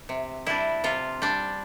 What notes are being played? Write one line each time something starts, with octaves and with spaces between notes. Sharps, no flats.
C3
G3 D4 E4
C3 F4
G3 D4